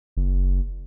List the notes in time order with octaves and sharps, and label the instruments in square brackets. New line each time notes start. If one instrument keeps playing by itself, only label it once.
[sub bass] F#1